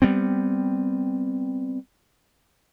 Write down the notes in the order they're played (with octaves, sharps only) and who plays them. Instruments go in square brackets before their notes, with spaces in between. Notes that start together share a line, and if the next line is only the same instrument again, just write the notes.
[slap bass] G3 B3 C4